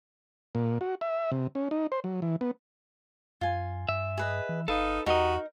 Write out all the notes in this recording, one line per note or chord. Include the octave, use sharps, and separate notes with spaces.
A#2
F#4
E5
C3
C#4
D#4
C5
F#3
E3
B3
F#2 F4 G#5
G2 E5
G#4 B4 D#5
E3
G1 D#4 A4 B4 F5
E2 D#4 F#4 G4 A#4 D#5